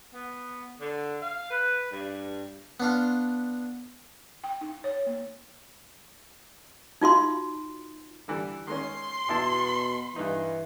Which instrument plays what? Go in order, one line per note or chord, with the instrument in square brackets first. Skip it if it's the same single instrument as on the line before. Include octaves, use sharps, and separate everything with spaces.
[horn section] B3
D3
F5
B4
G2
[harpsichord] B3 D4 F4
[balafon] G5
D#4
C#5
A#3
[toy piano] D#4 F4 F#4 C6
[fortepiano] D3 E3 G3
[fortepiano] D#3 G#3 C#4 [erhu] C6
[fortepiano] E2 E4 A5 [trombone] B2
[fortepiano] G2 D#4 [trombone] E3